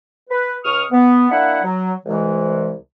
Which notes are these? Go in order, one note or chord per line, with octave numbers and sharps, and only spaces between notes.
B4
C#2 C#6 D#6 F6
B3
A#3 D4 E4 E5 F#5
F#3
C2 E3 G#3